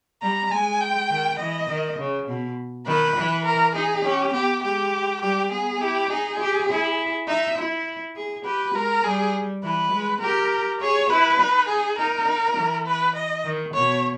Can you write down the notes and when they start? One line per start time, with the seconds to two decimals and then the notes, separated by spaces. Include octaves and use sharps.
0.22 G3 A#5
0.51 G#3 G#5
0.81 G5
1.10 D#3
1.39 E3 D#5
1.69 D#3
1.99 C#3
2.28 B2
2.87 D#3 B4
3.16 E3
3.45 A#4
3.75 D#4 G#4
4.05 C#4 G4
4.33 B3 G4
4.63 G#3 G4
5.21 G3 G4
5.51 B3 G#4
5.81 E4 G4
6.10 D#4 G#4
6.40 G4
6.69 E4
7.27 D#4 E5
7.58 E4
8.16 G#4
8.45 G4 B4
8.74 G#3 A#4
9.04 G3 G#4
9.63 E3 B4
9.92 G#3
10.21 G4 A#4
10.81 G#4 C#5
11.10 E4 B4
11.39 D#4
11.69 G#4
11.98 D#4 A#4
12.28 D#4
12.57 E3
12.86 B4
13.16 D#5
13.45 D#3
13.74 B2 C#5